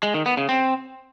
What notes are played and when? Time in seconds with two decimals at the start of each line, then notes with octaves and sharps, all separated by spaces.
0.03 G#3
0.14 D#3
0.26 B3
0.37 C#3
0.49 C4